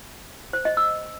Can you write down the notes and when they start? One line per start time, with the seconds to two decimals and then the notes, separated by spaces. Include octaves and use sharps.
0.53 C5
0.65 D#5
0.77 E6